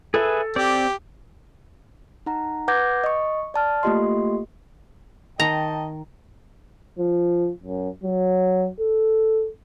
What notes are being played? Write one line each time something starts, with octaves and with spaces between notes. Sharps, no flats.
G#4 A4 B4 E5
C4 G4 D5
D#4 F#5 A#5
B4 F#5 D6 G6 G#6 A#6
D#5 C#6
D5 A5 F6
A3 A#3 F4 G4 D#5 C6
D#3 D#5 G5 A5 A#5
F3
F#2
F#3
A4